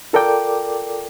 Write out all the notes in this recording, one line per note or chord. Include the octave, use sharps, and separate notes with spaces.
F4 A4 A#4 D5 G5 D6